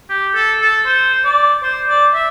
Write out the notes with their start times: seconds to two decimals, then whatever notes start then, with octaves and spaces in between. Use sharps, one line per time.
0.09 G4
0.35 A4
0.61 A4
0.86 C5
1.24 D5
1.63 C5
1.89 D5
2.14 E5